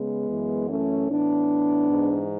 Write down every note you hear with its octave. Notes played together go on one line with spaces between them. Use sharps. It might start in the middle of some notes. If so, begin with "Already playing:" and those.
Already playing: C#3 G#3 B3
F#2 E3
A3 C#4
A2 E3 B3 D4
G#2 E3